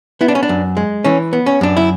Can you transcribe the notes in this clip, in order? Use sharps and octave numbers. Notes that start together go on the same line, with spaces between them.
B3 E4
D4
C#4
D4
F#2
G#3
E3 C#4
B3
C#4
F#2 D4
E4